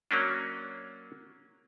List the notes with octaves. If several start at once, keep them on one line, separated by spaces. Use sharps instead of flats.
F#3 A#3 C#4 D4